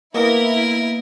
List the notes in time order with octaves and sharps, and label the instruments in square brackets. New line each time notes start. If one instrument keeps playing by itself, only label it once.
[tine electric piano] A#3 B3 D#5 [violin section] E4 [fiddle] A#4